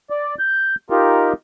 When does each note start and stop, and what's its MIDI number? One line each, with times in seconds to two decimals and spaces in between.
0.10 0.35 74
0.39 0.75 91
0.90 1.33 63
0.90 1.33 65
0.90 1.33 67
0.90 1.33 70